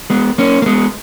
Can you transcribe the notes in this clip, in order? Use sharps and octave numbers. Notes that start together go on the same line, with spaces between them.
G#3 B3
A#3 C#4
A#3
G#3 B3